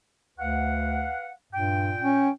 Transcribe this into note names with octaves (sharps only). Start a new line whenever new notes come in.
D2 B4 F5 F#5
G2 A#2 G5
C#4